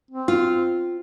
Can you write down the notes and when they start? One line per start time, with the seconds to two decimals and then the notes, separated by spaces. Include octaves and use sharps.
0.11 C4
0.28 F4